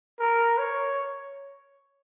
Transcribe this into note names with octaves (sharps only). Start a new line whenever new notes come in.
A#4
C#5